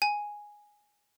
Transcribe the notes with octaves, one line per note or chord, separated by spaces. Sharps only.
G#5